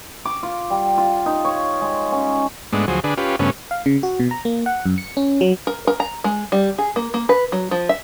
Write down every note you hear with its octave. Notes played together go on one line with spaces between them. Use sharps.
D6
F4
G3
F4
D#4
C#5
G#3
C#4
G#2 G#3 A3 B3 D4
D2 F3 F#3 G#4 C5
D3 D4 G#4 B4
C#4 F4 G4 B4
G2 C#3 A3 B3 C#4
F5
C#3
F#4
B2
A#5
A#3
F#5
F#2
C#7
C#4
F#3
A#4
A#4
A#5
G#3
G3
G#4
A#3
A#3
B4
F#3
F3
E5